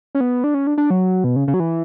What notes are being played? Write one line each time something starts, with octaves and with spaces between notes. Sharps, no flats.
C#4
B3
D4
C#4
D4
D4
F#3
B2
C#3
C#3
F#3
E3